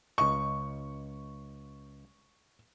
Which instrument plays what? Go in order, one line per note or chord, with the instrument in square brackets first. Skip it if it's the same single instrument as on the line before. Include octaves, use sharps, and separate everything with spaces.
[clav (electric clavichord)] C#2 D#5 [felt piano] C#6